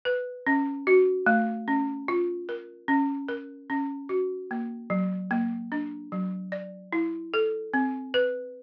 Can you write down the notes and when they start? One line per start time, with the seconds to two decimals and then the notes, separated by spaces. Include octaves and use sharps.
0.05 B4
0.47 C#4
0.87 F#4
1.26 A3
1.68 C#4
2.08 F4
2.49 A#4
2.88 C#4
3.29 A#4
3.70 C#4
4.09 F#4
4.51 A#3
4.90 F#3
5.31 A#3
5.72 D4
6.12 F#3
6.52 D5
6.93 E4
7.34 A4
7.74 C4
8.14 B4